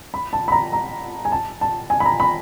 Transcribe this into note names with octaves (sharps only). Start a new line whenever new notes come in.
B5
A5
B5
A#5
A#5
G#5
A5
A5
G#5
B5
A#5
B5